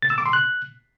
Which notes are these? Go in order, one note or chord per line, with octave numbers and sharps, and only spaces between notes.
A6
E6
D6
C6
F#6